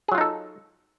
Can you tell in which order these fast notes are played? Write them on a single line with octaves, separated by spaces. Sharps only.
G#4 F#3 F4 D#4 A4